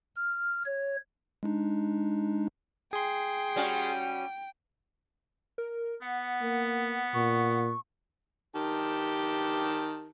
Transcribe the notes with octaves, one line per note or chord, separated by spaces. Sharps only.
F6
C#5
G#3 D4 D#4
G#4 G5 C6
G3 C#4 F#4
A#4
B3 F#5
A#3
A#2 C#6
D#3 G4 A5